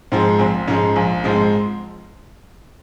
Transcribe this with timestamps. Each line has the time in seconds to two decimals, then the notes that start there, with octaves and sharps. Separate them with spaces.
0.12 G#2 F3 G#3 C4
0.39 A#1 C4
0.68 G#2 F3 G#3 C#4
0.96 A#1
1.24 G#2 F3 G#3
1.34 C4